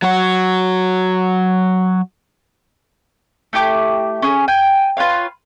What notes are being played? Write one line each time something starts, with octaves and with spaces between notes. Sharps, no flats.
F#3 F#4
A3 E4 G4 D6
C#4 G#4
G5 G#5
F4 B4 C#5 F5